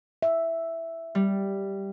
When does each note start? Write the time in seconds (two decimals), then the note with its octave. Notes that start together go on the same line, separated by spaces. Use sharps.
0.22 E5
1.15 G3